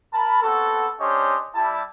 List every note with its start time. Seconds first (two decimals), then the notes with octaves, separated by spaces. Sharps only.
0.13 A#4 A5 B5
0.42 B3 C4 F#4 A4
1.00 C#4 D4 G4 C5 C#5 D#5
1.54 G3 E4 A5